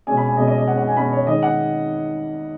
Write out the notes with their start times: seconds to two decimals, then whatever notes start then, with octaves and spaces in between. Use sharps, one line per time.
0.07 B2 G#3 C#4 G#5
0.17 B5
0.27 G#5
0.37 B2 G#3 C#4 D#5
0.47 D#5
0.58 D#5
0.67 B2 G#3 C#4 F#5
0.78 F#5
0.88 G#5
0.97 B2 G#3 C#4 B5
1.12 C#5
1.27 D#3 G#3 C#4 D#5
1.43 F#5